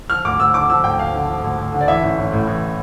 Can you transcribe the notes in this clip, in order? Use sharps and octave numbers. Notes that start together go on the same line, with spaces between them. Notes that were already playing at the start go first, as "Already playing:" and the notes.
F3 F6
D2 D6
D2 E6
D3 D6
F3 E6
D2 G5
D2 F5
D3
F3
D2
D2
D3
D5
E3 E5
A1
A1
A2
E3